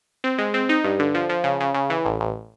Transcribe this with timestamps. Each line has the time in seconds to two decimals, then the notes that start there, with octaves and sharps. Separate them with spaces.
0.24 C4
0.38 G#3
0.54 C4
0.69 D#4
0.84 G2
0.99 D3
1.15 F3
1.29 F3
1.44 C#3
1.60 C#3
1.74 C#3
1.90 E3
2.05 A1
2.20 A1